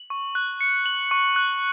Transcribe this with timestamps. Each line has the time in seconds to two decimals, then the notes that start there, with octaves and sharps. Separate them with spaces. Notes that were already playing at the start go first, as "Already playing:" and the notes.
Already playing: F#7
0.10 C#6
0.35 F#6
0.61 C#7
0.86 F#7
1.11 C#6
1.36 F#6